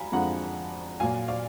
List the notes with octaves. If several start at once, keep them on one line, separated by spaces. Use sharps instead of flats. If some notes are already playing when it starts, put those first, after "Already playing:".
Already playing: F5 G#5 A#5 B5
F2 D3 F3 G#3 F#5 A#5
A#2 F#3 F5 G#5
D5 F5